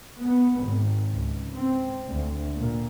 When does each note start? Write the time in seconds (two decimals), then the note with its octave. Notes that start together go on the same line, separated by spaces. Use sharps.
0.23 B3
0.62 G#1
1.10 C#2
1.54 C4
2.07 D2
2.54 A#2